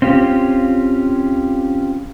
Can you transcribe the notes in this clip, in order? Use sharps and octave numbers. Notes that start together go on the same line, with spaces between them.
C4 C#4 F4 G4